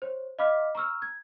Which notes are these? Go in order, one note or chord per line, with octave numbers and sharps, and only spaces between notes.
C5 C#5
D#5 F5 B5 D6 F6 B6
A#5 C#6 E6 F6
G#6